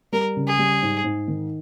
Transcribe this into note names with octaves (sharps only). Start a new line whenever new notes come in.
G3 A#4
C#3
G#4
G3
G#2
G#2
D#3